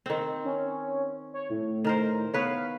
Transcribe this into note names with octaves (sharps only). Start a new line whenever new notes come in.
D#3 C4
C#4
C#5
A2
D#3 A#4 C5
B3 B4 C#5 F5